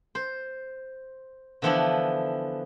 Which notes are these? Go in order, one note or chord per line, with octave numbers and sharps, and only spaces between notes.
C5
D3 E3 F3 B3 D4 E4